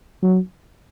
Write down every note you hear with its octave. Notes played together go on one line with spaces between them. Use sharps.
F#3